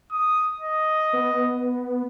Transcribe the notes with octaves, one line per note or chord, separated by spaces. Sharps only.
D#6
D#5
B3